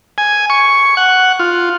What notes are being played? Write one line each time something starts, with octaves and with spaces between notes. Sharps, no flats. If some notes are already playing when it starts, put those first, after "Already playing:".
G#5
C#6
F#5
F4